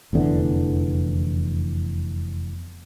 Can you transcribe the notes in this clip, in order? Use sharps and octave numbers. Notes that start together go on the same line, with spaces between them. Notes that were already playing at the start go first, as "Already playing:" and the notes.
F1 E2 D3 E3